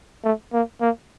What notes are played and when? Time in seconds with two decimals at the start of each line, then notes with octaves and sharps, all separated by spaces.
0.24 A3
0.53 A#3
0.81 A#3